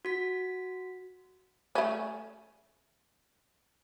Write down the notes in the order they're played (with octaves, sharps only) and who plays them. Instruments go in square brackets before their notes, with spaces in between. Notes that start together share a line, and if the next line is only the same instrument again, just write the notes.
[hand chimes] F#4 B6
[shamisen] A3 C#4